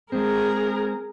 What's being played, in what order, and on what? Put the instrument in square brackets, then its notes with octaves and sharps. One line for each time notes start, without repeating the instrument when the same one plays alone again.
[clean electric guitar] G#3 C4 [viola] G#4 A#4